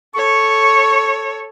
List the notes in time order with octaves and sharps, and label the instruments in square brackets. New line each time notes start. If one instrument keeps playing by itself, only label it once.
[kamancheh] A4 C#5 [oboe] C#6